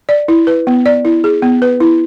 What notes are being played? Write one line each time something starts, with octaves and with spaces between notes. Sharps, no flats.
D5
E4
B4
B3
D5
E4
G#4
B3
B4
E4